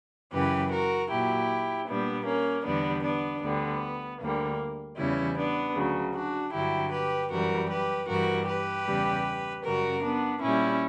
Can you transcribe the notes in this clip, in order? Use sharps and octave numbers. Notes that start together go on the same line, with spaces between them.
F#2 C#3 E3 G4 B4
F#4 A#4
A#2 F#3 E4 G4
A#2 G3 B3 D4
A#3 C#4
E2 D3 G3 B3 D4
B3 D4
D2 D3 G3 B3
D2 D3 G3 A#3
E2 C#3 E3 G3 C#4 E4
B3 D4
D2 C#3 F#3
D4 F#4
G2 D3 F#3 E4 G4
G4 B4
F#2 E3 G3 F#4 A#4
G4 B4
G2 E3 G3 F#4 A#4
G4 B4
E2 C#3 G3
F#2 C#3 G3 F#4 A#4
B3 D4
A#2 G3 C#4 E4